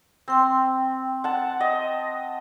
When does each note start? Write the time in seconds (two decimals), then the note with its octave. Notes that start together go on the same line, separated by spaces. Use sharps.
0.28 C4 G5 C6
1.24 F#5 A5
1.60 D#5